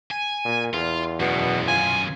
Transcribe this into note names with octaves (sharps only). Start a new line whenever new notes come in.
G#5
A#2
E2 F4
F#2 B2 D#3
F4 G#5